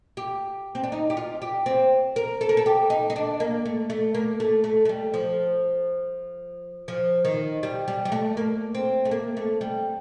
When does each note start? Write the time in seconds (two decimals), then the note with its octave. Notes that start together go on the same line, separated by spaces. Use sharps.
0.17 G4
0.75 C4
0.84 D4
0.92 D#4
1.10 G4
1.17 F4
1.42 G4
1.66 C4
2.16 A#4
2.41 A4
2.49 A#4
2.57 A4
2.66 G4
2.90 D#4
3.10 D#4
3.16 D4
3.40 A#3
3.65 A3
3.90 A3
4.15 A#3
4.40 A3
4.64 A3
4.85 A3
4.89 G3
5.14 F3
6.88 F3
7.25 D#3
7.63 G3
7.88 G3
8.05 G3
8.12 A3
8.37 A#3
8.75 C4
9.05 A3
9.11 A#3
9.37 A3
9.61 G3